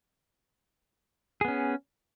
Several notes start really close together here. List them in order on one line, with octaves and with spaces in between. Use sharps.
G#4 B3 C#4